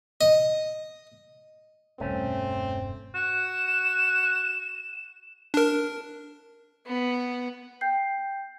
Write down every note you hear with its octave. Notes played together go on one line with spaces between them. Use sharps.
D#5
E1 G2 A3 C4 C#4
F#4 E7
D4 A#4
B3
G5 G6 C7